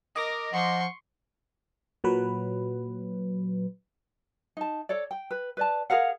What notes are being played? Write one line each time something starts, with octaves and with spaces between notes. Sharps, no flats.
A#4 D#5 D6 A#6
F3 F#5 C6 C#6
A#2 F#3 B4
D#4 A5
A4 C#5 D5
G5
B4
B4 D5 A5
G#4 A#4 F5 F#5